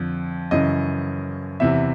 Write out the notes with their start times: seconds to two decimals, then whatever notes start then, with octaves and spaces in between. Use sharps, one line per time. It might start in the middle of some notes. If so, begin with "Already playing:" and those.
Already playing: F2 D3
0.51 F#2 C#3 E3 D#5
1.60 E2 C3 E3 E5